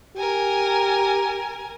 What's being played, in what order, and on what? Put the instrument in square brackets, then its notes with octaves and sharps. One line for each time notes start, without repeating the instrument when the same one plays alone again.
[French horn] G4 [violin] A#4 G#5